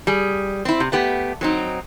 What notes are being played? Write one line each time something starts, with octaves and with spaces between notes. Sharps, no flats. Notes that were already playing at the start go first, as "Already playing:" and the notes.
G3 G#4
C4 E4
C3
A3 B3 G4
F#3 C4 D#4